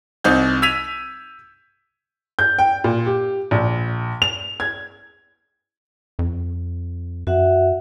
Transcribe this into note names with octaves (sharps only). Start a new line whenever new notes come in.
C2 C4 D#4 G6
E6 G#6 B6 D#7 F7
G6
G5
A#2
G4
A#1
F7
G#6
F2
F#2 F#4 E5 F#5